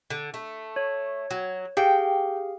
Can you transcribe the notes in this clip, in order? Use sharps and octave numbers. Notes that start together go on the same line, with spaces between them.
D3
A3
C#5
F#3
G4 G#4 F5 G5